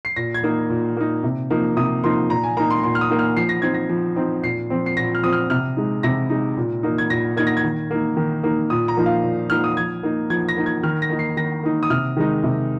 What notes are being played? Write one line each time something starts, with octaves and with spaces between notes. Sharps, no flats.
C7
A#2 A#6
G#6
A#3 D#4
A#2
A#3 D#4
C3
F3 A#3 D#4
C3 D#6
F3 A#3 D#4 C6
A#2 A#5
G#5
A#3 D#4 A#5
C6
A#2 C6
F6
D#6
A#3 D#4
F6
F3 C7
A#6
C4 D#4 G#6
A#6
F3
C4 D#4
A#2 C7
F3 C4
C7
A#2 A#6
F6
F3 C4 D#6
F6
C3 F6
G#3 D#4
C3 A#6
G#3 D#4
A#2
A#3 D#4
G#6
A#2 A#6
A#3 D#4 G#6
A#6
G#6
D#3
A#3 D#4
D#3
A#3 D#4
A#2 D#6
A#5
F3 A#3 D#4
F5
A#2
F3 A#3 D#4 F6
D#6
F3 G#6
A#3 D#4
F3 G#6
A#6
A#3 D#4
G#6
D#3 F6
A#6
A#3 D#4
C7
D#3 A#6
A#3 D#4
D#6
C3 F6
D#3 G#3 D#4
C3